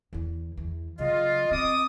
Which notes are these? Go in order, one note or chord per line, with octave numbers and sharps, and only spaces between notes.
E2 E3
E2 E3
C#3 F#3 F4 D#5
C4 F4 D6 D#6